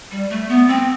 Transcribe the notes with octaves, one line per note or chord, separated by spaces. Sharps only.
G3
A3
B3
C4